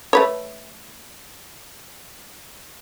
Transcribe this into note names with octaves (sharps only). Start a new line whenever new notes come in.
A3 B4 C#5